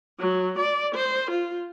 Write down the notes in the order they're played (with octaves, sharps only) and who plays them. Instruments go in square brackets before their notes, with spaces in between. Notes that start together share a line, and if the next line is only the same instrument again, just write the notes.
[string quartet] F#3
D5
C5
F4